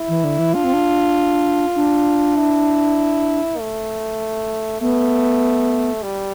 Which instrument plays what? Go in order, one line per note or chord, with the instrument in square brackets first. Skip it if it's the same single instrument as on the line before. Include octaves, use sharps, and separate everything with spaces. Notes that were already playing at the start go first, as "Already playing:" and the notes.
Already playing: [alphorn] E4
[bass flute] E3
D3
E3
[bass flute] D4 [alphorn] F4
[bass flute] C4
D4
D4
[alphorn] E4
A3
[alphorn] A3 [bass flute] B3
[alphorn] G3